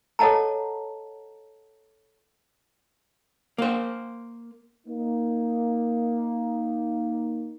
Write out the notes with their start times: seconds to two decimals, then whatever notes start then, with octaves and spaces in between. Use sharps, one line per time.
0.19 A4 C#5 D#5 F#5 A5 A#5
3.58 A#3 C5
4.87 A#3 D#4